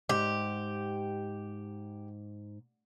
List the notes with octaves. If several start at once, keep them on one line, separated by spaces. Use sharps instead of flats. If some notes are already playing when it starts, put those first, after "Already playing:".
G#2 G4